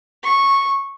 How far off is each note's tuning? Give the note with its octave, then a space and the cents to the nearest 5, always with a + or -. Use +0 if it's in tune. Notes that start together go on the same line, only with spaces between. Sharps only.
C#6 -10